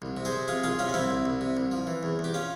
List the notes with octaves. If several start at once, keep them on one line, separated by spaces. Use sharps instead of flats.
C2
C3
G#4 C5
C3
C3 F4 G#4
C2 F4 G#4
C3 C#4 F4
C#4
C2 C4 E4
C2
C2
C3
C2
F3
E3
E2
E2
G4
C#4 F4